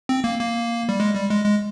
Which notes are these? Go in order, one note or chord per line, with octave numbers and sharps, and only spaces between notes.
C4
A#3
A#3
G3
G#3
G3
G#3
G#3